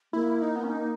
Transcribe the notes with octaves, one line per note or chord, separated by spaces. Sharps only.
A#3 E4
E4
D#4
B3
C#4
D#4